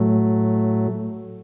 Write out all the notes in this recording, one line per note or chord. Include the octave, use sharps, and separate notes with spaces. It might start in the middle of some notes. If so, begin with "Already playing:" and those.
Already playing: A2 F#3 A3